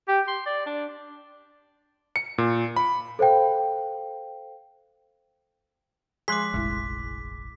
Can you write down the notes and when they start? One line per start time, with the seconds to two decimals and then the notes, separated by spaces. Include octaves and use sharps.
0.08 G4
0.28 C6
0.46 D5
0.66 D4
2.16 C#7
2.38 A#2
2.76 B5
3.19 A4 C5 F5 G5
6.28 F3 G#3 G#4 C6 D6 F#6 B6
6.54 F1 A#1 G#3 E4